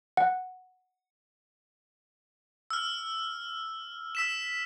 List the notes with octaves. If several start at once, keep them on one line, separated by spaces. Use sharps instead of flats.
F#5
E6 F6
E6 B6 E7